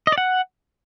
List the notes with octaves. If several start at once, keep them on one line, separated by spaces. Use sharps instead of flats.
D#5
D5
F#5